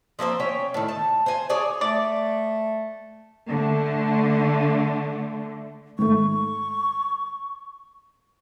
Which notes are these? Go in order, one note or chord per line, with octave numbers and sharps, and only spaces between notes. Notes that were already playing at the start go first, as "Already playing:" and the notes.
F3 A#3 C4 C5
C#4 C#5 G5
A2 D#3
A5
C5 G#5
G#4 C#5 D5 G#5
A3 D5
D3 A3
G#2 D#3 A3 C#6